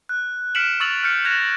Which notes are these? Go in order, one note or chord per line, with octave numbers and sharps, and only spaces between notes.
F#6
F6 B6 C#7 D7 E7 F#7
C#6 E6 A6 F7 F#7
F6 G6 C#7
F#6 G#6 A#6 E7 F7